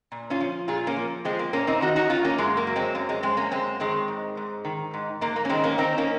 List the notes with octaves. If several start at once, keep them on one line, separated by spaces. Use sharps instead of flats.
A#2
C#4 F4
F3
A#2 F4 G#4
A#3 C#4
F3
F3 G#3 C4
A#3
A#2 A#3 C#4
C4 D#4
D#3 D#4 F#4
D#4 F#4
D#3 C#4 F4
A#3 C#4
F#2 G#3
A#3
F#3
G#3 C4
F#2 A#3
G#3 C4
F#2 G#3 C4
A#3 C#4
F#2 G#3 C4
D#3 G#3 C4
G#2
G#2
D#3
G#2
G#2 A#3
A#3
C#4
D#3 G#3 C4
A#3 C#4
D#3 C4 D#4
A#3 C#4